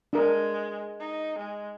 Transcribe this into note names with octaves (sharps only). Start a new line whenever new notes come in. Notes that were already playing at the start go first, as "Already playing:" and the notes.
G#3 D4 A#4
D#4
G#3